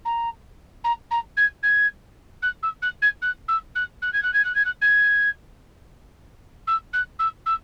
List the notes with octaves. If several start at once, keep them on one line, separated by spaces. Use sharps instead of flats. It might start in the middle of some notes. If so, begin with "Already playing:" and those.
A#5
A#5
A#5
G#6
G#6
F#6
E6
F#6
G#6
F#6
E6
F#6
F#6
G#6
F#6
G#6
F#6
G#6
F#6
G#6
E6
F#6
E6
E6